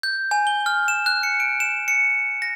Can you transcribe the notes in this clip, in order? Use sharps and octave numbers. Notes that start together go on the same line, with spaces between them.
G6
G#5
G7
F6
E7
F#6
C#7
D7
E7
C#7
A#6